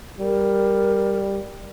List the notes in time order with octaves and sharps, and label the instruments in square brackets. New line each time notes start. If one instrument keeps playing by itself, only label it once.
[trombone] G3 [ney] A#4